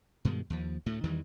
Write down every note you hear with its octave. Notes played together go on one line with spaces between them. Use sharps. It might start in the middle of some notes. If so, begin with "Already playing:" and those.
G2 B2 D#3 G#3
D#2 F3
D2 A2 A3
E2 D#3 E3 G3